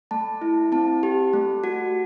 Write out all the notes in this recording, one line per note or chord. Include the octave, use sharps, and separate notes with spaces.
A3 A5
E4
C4 A5
G4
A3
F#4